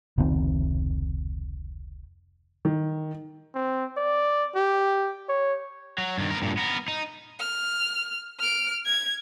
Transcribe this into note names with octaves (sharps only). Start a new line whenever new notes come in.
F1 C#2 D#3 C4
D#3
C4
D5
G4
C#5
F#3
G2 D#3
B3 A#4
G2 A#2
B3 A#4
D#4
F6
F6 D7
G#6